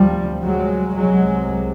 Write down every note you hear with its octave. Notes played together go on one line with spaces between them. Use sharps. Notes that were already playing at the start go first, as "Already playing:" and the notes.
Already playing: D2 C3 F3 G3
F#3 G#3
C2 C3 F#3 G#3